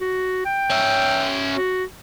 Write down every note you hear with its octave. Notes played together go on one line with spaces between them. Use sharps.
F#4
G5
C#4 E5
F#4